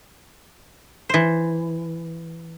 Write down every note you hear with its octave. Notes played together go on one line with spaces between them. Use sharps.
E3 C5